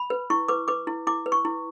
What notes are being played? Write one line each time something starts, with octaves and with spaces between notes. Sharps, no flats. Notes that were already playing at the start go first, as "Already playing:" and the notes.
Already playing: B5
B4
E4 C#6
B4 D6
B4 D6
E4
E4 D6
B4
C#6
E4